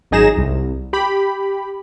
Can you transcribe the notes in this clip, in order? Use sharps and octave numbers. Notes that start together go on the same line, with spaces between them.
G#1 F#2 D#4 G#4 A#6 E7
C2
G4 B5